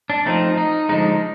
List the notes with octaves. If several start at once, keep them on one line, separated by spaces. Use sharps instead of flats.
D4
F3 A3 C4 D#4
D#4
D3 F3 G#3 D#4